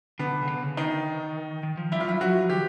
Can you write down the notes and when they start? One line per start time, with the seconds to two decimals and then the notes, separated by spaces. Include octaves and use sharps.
0.19 D3 B3
0.42 C#3
0.48 D3
0.62 C#3
0.77 D#3 D#4
1.63 D#3
1.77 F3
1.92 G3 E4
2.01 F4
2.06 F#3 E4
2.21 F#3 F#4
2.35 F3
2.49 D#3 G4